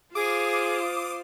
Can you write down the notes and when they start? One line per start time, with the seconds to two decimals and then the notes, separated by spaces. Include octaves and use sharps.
0.15 F4 G#4 C5 F5 D6 D#6